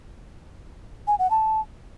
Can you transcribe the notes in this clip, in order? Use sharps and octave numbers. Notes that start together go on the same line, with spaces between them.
G#5
F#5
A5